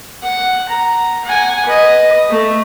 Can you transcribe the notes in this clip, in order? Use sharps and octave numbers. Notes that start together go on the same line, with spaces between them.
F#5
A#5
F#5 G#5
B4 D#5
A3